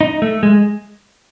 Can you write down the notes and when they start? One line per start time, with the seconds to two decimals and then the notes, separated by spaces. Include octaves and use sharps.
0.01 D#4
0.22 A3
0.43 G#3